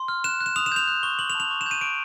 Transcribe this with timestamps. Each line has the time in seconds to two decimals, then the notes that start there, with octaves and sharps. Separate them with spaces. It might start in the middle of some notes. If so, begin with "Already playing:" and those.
Already playing: C6
0.08 F6
0.24 F#6 E7
0.41 F#6
0.46 E7
0.56 D#6 F7
0.66 E7
0.72 G6 F7
0.88 F#6
1.03 C#6 G7
1.19 D6 F#7
1.30 F7
1.35 A5
1.40 F7
1.51 C#6
1.61 E7
1.66 G6 D#7
1.81 C#6 D7